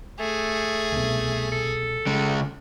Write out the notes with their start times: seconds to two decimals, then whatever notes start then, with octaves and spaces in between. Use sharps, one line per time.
0.19 A3 G#4
0.92 C2 B2
1.52 A4
2.07 C#3 G#3